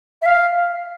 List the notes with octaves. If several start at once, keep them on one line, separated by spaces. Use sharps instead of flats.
E5
F5